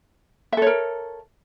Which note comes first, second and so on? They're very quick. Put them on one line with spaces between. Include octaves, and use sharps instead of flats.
E5 A4 C#5 A#4